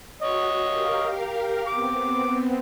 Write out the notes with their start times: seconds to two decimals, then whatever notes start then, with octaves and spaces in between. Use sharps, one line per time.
0.22 F#4 C#5 D#5
0.65 G4 A#4 F5
1.67 B3 C4 D6